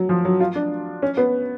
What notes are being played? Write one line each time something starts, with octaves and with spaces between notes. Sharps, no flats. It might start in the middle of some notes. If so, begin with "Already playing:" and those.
Already playing: F#3
F3
F#3
F4
D4
C#4
B3